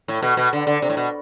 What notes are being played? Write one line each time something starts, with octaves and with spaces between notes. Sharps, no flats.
A2
B2
B2
D3
D3
C3
A2
B2